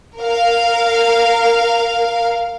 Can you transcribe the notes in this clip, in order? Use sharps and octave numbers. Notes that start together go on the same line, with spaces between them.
A#4 F5